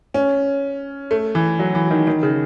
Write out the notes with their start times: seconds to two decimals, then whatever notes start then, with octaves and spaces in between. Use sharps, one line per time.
0.14 C#4
1.11 A3
1.35 E3
1.59 F#3
1.75 E3
1.91 D#3
2.07 D#3
2.23 C#3